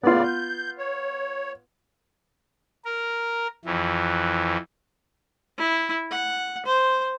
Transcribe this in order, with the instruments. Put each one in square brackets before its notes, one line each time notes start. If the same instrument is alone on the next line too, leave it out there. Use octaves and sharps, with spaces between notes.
[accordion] A2 C#3 D5 [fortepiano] B3 F4
[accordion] G6
C#5
[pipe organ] A#4
F2 E3
[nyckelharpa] E4
F#5
C5